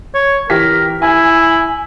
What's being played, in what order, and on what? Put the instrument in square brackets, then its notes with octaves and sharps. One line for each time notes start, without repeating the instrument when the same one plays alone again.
[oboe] C#5
[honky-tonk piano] E3 G4 B6 [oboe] A#4
[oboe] E4 [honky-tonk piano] G#5